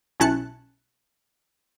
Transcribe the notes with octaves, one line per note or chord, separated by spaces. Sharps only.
B1 C#4 E4 A5 F#6 C#7